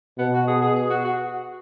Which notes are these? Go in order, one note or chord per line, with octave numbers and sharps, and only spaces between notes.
B2 B3
F#4
G#4
G#4
G#4
F#4
F#4